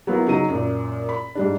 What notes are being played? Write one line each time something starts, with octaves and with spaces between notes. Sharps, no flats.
F#3 A#3 B3 E4 F4
C#3 F#3 D#4 D#7
F#2 A#2
B5
G#2 G3 D4